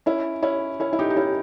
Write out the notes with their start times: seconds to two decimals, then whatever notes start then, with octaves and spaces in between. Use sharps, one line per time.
0.06 C#4 E4
0.42 C#4 E4
0.80 C#4 E4
0.93 E4
0.99 D#4 G4
1.10 D#4
1.16 C#4 E4